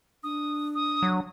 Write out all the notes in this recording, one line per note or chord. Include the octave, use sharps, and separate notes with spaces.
D4 D#6
D#6
F#3